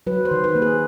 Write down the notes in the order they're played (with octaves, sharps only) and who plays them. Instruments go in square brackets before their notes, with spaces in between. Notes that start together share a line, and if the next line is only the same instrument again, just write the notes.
[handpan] F#3 B4
C5
D#3
B4
A#3
G#4